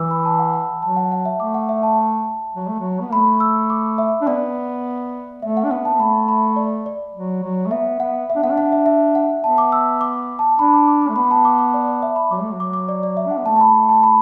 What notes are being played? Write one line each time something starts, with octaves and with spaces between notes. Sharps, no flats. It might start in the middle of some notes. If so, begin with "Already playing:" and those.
Already playing: E3 D6 E6
B5
A5
F#5
F#5
F#5
F#3 A5
F#5
F#5
E5
A3 D6
F#5
E5
A5
F#3
A3
F#3
B3
A3 B5
E6
D6
E5
D4
B3 D5
A3 E5
F#5
D4
B3 F#5
A5
B3
A3 B5
B5
D5
D5
F#3
F#3
A3
B3 E5
B3 F#5
E5
D4
B3 F#5
D4
F#5
E5
E5
F#5
B3 A5
D6
E6
D6
A5
D4 B5
D6
D6
D6
A3
B3 B5
A5
D6
D6
D5
D5
E5
B5
F#3 D6
A3
F#3
D6
D6
D5
D5
E5
D4 F#5
B3
A3 A5
A5
B5
A5
B5